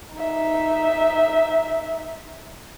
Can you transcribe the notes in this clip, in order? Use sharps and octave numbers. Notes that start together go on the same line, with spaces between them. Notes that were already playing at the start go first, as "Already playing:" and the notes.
D#4 E5